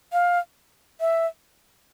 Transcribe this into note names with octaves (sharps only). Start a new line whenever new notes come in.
F5
E5